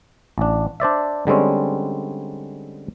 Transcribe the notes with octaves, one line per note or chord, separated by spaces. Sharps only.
A1 D4
D4 C5 D5 E5
D3 G3 G#3 C4 C#4